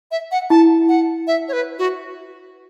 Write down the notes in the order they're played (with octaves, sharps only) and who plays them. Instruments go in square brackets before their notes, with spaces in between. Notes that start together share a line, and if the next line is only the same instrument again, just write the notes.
[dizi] E5
F#5
[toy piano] E4 [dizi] A5
[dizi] F#5
E5
C#5
B4
F#4